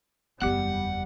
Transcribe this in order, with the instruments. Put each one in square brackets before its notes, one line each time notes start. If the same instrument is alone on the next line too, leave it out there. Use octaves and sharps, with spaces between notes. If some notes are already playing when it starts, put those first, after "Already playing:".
[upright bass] F#1 E2 [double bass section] G3 [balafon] B3 G4 [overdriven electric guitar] F#5